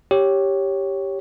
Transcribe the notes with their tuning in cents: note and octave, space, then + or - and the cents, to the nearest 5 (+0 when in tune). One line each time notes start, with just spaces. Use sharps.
G4 +0 C#5 +0